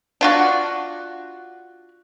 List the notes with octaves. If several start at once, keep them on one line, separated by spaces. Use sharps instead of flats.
D4 F4 F#4